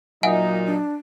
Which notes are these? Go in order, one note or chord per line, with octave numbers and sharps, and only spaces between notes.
A#2 F#3 D#4 D#5 E5 F#5 G#5
D4